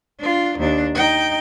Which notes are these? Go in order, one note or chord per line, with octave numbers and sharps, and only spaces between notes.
D4 F4
D#2 D4
D#4 G5